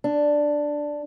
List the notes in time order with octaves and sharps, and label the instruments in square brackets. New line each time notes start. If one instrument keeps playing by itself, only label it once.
[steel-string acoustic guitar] D4